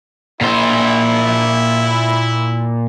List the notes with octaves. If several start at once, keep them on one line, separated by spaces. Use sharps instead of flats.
A#2 E4 C5